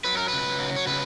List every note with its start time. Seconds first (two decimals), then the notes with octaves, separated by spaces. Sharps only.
0.04 F#3 B4
0.17 A#4
0.28 C#3 B4
0.59 F#3
0.76 C#5
0.87 C#3 B4